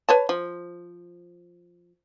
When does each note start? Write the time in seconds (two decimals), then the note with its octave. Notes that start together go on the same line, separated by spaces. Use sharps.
0.09 B4 C#5 A5
0.29 F3